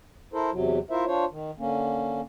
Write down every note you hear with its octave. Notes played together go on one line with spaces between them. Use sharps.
E4 A4 A#4 C5
E2 C3 F#3
E4 F4 A#4 C5 E5
D4 F4 C5 C#5
D#3
D3 A#3 C#4